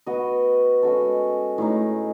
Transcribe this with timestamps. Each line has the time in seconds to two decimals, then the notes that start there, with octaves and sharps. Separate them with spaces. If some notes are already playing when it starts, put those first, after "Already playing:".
0.06 B3 F#4 B4 D#5
0.83 G#3 C#4 F#4 A4
1.58 A2 G#3 D#4